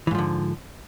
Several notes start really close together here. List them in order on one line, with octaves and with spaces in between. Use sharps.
E3 G#2 F3 D3